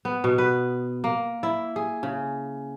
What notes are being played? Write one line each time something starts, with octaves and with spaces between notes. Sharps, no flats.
B3
B2
B4
A#3
E4
G#4
C#3